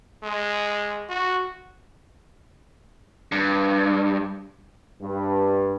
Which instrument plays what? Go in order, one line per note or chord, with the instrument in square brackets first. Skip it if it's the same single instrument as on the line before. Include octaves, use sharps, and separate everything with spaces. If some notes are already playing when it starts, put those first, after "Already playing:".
[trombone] G#3
F#4
[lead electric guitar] G2
[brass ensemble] G2